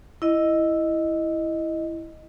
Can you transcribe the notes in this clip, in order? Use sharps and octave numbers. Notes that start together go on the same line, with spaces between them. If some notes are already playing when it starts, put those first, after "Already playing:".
E4 D#5